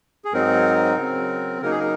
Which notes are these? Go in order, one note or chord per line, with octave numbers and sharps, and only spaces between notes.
G#4
G#2 F#3 C4 D#4 A#4
C#3 F#3 C4
C#3 F#3 A#3 D#4 A#4
G#4
A#4